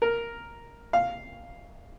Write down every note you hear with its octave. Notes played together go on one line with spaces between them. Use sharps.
A#4
F5